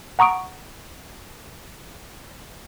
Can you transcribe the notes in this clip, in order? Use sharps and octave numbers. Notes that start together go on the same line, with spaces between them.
F#5 A#5 C#6 D#6 D7